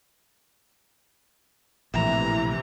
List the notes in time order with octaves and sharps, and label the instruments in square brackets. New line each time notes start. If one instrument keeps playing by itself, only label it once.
[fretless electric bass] A#1 A2 [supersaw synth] C3 E3 [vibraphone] E5 [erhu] A#5